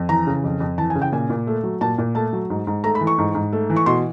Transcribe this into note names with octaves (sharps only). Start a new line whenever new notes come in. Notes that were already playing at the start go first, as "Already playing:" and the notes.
Already playing: F2
E3 A#5
C#3
F2
F2
E3 A5
G#5
C#3
G5
A#2 G#5
A#2
A3
F#3
A#2 A5
A#2
A3 A5
F#3
G#2
G#2
A3 A#5
B5
E3
C#6
G#2
G#2
A3
E3
C#6
B2 C6